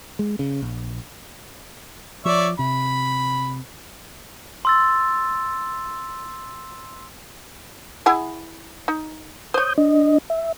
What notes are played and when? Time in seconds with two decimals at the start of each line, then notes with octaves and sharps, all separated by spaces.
0.19 G#3
0.39 C#3
0.62 A#1
2.25 F3 C#5 D5 E5
2.59 C3 B5
4.65 C6 E6 A6
8.06 E4 G#4 F#5
8.88 D#4
9.54 C5 C#5 D#6 G6
9.78 D4 D#5
10.30 E5